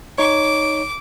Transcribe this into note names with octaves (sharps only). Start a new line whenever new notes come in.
D#4 C#5 D6